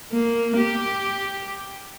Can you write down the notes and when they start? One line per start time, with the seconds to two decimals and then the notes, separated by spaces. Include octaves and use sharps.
0.12 A#3
0.57 G4